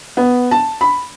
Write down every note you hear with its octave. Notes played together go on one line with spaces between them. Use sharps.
B3
A5
B5